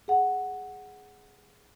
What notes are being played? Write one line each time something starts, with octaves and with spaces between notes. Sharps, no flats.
G#4 F#5